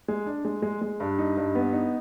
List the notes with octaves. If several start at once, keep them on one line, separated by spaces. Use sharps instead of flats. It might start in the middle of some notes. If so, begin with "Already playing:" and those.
G#3
D4
G#3
G#3
G#3
G2
D#4
G2
B3
D#4